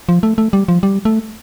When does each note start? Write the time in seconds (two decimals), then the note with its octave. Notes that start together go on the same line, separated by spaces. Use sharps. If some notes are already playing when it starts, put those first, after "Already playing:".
0.09 F3
0.23 A3
0.38 A3
0.53 G3
0.68 F3
0.83 G3
1.05 A3